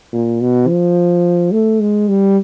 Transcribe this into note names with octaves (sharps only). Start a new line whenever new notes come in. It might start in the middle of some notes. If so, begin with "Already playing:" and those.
A#2
B2
F3
A3
G#3
G3